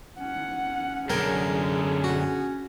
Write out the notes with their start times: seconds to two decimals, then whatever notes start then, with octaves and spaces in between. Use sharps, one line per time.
0.20 C#4 F#5
1.10 F#2 D3 G#4 A#4 G5 G#5
2.04 F#4